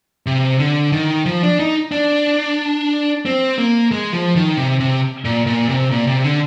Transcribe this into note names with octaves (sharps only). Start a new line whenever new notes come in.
C3
D3
D#3
F3
D4
D#4
D4
C4
A#3
G#3
F3
D#3
C3
C3
A#2
A#2
C3
A#2
C3
D3